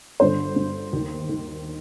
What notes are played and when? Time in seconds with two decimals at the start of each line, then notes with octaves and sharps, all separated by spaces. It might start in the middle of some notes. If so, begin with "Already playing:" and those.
0.20 G1 G2 D3 C5
0.56 G1 G2 D3
0.93 D#2 D#3
1.29 D#3